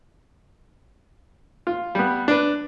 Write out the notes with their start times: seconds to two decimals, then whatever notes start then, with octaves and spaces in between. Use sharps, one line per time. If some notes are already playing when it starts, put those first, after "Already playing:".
1.67 F4
1.95 G3 B3
2.28 D4 B4